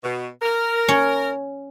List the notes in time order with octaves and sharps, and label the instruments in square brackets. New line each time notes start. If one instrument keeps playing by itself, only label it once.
[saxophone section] B2
A#4
[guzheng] C#4 C#5